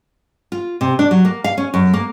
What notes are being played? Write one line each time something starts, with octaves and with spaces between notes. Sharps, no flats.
F4
C3
D4
F#3
A#3
F5
C#4
F#2
A#3